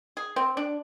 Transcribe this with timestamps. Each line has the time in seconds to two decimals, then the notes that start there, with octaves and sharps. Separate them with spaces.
0.17 G#4
0.36 C4
0.57 D4